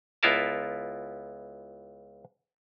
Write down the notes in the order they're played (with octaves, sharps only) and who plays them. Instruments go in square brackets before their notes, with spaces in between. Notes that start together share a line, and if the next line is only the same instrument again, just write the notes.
[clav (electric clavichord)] C#2 B3 E4 F4 A#4 A5